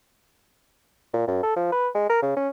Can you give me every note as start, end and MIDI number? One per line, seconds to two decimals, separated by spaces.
1.13 1.27 46
1.27 1.42 42
1.43 1.53 69
1.57 1.71 53
1.72 1.88 71
1.95 2.07 56
2.10 2.18 70
2.22 2.33 49
2.36 2.49 61